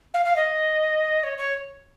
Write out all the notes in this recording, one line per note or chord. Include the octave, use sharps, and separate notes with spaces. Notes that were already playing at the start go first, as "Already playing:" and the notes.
F5
F5
D#5
C#5
C#5